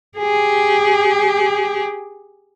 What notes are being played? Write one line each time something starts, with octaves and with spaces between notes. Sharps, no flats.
G4 G#4